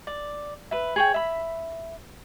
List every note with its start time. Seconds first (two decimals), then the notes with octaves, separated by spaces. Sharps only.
0.07 D5
0.71 B4 E5
0.96 G#4 C#5 G5
1.14 E5 B5